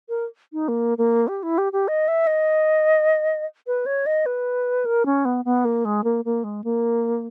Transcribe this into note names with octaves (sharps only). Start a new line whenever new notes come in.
A#4
D#4
A#3
A#3
G4
E4
G4
G4
D#5
E5
D#5
B4
C#5
D#5
B4
A#4
C#4
B3
B3
A#3
G#3
A#3
A#3
G#3
A#3